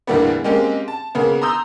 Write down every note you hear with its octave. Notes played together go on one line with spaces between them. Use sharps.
E2 A2 D3 G3 A#3 B3
G#3 A#3 C4 C#4 G4
A5
C#3 A#3 B3
A#5 C6 D#6 E6 G6